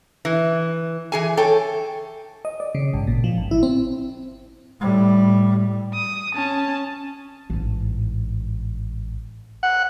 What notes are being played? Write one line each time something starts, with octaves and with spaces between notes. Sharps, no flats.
E3
E3 G#4 G#5
A4 C#5 G5
D#5
D5
C#3
G#1
A#2
F3
G#1
E4
C4
A2 G3
D#6
C#4 A5
A1 G#2
F#5